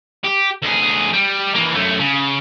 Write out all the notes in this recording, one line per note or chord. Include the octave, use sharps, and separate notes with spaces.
G4
D2 G#4
G3
E3 A#3
F#2 A3
C#3